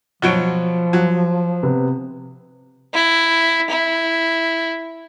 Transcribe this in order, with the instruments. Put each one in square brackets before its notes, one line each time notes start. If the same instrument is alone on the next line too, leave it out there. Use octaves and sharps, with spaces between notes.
[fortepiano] B2 F#3 C#5 [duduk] F3 [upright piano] D7 G7
[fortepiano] F#3
[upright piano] C3 B3
[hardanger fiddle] E4
E4